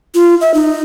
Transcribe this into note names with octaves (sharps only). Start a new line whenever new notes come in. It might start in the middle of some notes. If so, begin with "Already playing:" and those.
F4
E5
D#4